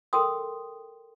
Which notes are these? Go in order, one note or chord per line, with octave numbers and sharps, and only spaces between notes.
A4 A#4 G5 C6 D#6